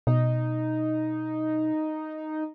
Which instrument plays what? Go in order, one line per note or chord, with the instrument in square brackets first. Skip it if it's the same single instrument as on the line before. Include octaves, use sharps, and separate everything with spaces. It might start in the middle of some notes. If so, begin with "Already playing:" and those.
[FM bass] B2 [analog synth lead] D#4